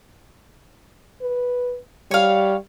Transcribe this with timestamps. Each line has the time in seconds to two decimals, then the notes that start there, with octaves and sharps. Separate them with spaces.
1.21 B4
2.11 G3 C#5 F5